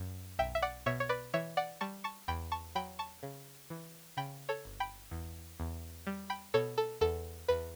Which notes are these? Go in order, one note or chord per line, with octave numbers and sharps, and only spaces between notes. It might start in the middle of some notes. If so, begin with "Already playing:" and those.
Already playing: F#2
B1 E5 G5
E5
D5 F#5
B2 C#5 E5
C#5
B4 D5
E3 C#5 E5
D5 F#5
G3 A5 C#6
A5 C#6
E2 G5 B5
A5 C#6
F#3 G5 B5
A5 C#6
C#3
E3
C#3 G5 B5
A4 C#5
G1
G5 B5
E2
E2
G3
G5 B5
B2 A4 C#5
A4
E2 A4
E2 B4